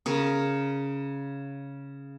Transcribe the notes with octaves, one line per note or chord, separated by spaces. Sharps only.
C#3 A#4